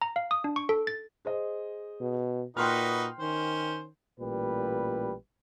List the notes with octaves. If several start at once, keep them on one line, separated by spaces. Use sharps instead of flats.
A#5
F5
D#6
D4
C#6
A4
A6
G#4 C5 D#5
B2
A#2 D#4 F#4 B4 G5 C6 F6
D#3 C#4 C5
A1 A#2 G3 B4